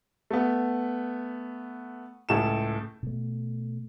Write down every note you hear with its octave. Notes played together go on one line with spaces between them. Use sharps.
A3 B3
C#2 A2 A4 E7
B2 A3